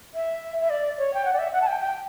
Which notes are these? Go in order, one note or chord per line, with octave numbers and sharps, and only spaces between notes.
E5
E5
D5
C#5
G5
F#5
D5
E5
F#5
A5
G5
G5